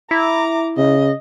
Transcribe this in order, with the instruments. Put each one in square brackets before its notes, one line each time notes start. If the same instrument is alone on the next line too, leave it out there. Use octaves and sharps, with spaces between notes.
[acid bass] E4 [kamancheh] A#5 D6
[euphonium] C#3 [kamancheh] D#5